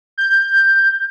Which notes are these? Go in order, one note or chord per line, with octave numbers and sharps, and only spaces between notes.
G6